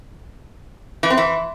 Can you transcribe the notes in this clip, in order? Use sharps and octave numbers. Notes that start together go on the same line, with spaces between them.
E3
C4
E3